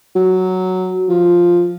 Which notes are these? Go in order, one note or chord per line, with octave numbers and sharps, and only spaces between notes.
F#3
F3